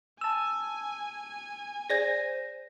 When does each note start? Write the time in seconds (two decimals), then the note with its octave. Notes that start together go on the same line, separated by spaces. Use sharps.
0.21 G#5 A5 E6
1.90 G#4 C5 D5 G#6 A#6